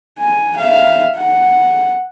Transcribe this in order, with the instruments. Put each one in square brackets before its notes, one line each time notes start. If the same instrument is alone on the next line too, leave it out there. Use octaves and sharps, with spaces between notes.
[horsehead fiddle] G#5
E5 F5
F#5